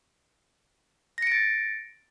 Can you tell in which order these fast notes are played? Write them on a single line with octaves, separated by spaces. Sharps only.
A#6 C#7 D7 A6